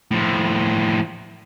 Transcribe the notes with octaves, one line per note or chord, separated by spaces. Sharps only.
A2 F3